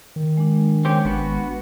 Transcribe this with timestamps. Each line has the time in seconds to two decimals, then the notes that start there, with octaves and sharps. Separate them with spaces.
0.16 D#3
0.37 G#3 D4
0.85 C4 C#4 G4
1.05 G#1 B3 F#4